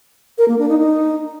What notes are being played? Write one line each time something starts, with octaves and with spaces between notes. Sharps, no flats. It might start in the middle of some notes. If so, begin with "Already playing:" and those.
A#4
A#3
D4
D#4
D#4